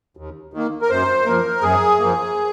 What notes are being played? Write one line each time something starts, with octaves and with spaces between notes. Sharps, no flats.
D#2
D#3 A#3
A#4
F#2 C5
F3 A#3 A#4
F#2 G#4
F3 A#3